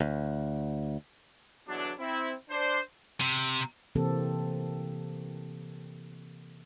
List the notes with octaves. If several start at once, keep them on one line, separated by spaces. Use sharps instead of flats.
D2
E2 B2 D3 F#3 D4
C4 E4
D4 C5
C3
C3 E3 A#3 C4 G4 A4